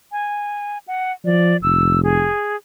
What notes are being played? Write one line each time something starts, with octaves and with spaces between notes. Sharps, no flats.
G#5
F#5
F3 D5
F1 E6
G#4